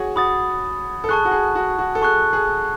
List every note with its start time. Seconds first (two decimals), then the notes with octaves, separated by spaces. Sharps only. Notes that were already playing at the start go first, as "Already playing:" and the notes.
Already playing: F#4 G#4 C#5
0.16 F#4 B5 D#6 A6
1.04 A4
1.09 G#4 A5 C#6 F#6
1.25 F#4
1.31 G#4
1.55 F#4
1.79 F#4
1.95 A4
2.02 G#4 A5 C#6 F#6
2.33 G#4